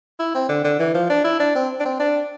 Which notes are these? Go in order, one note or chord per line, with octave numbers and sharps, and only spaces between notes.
E4
C4
D3
D3
E3
F3
D4
E4
D4
C4
D4
C4
D4